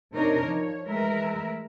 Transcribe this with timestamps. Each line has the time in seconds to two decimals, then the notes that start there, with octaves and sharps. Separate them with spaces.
0.13 C3 D4 D#4 A#4 C#5
0.44 F3 C#5
0.87 E3 G#3 A3 A#4 B4 E5